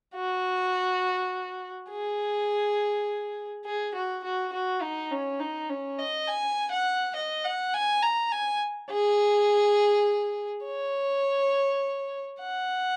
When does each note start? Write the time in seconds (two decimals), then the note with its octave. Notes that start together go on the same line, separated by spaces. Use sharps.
0.15 F#4
1.90 G#4
3.65 G#4
3.94 F#4
4.24 F#4
4.53 F#4
4.82 D#4
5.11 C#4
5.40 D#4
5.69 C#4
5.99 D#5
6.28 G#5
6.71 F#5
7.15 D#5
7.45 F#5
7.74 G#5
8.03 A#5
8.32 G#5
8.90 G#4
10.65 C#5
12.40 F#5